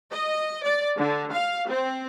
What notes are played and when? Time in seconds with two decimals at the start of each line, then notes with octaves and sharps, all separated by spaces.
0.12 D#5
0.64 D5
0.98 D3
1.33 F5
1.69 C4